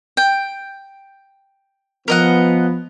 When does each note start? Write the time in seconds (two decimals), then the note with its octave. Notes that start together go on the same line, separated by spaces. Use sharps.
0.17 G5
2.08 F3 B3 A#4 D#5 F#5